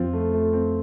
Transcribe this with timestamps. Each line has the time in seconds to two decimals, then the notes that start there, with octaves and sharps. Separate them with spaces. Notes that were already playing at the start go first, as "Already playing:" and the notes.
Already playing: F2 F3 C4 F4
0.13 A3
0.33 A3
0.53 C4